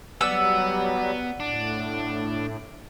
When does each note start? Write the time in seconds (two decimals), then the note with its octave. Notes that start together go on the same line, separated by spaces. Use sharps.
0.21 F#3 G3 B3 D5 F#5 E6
1.40 A2 D4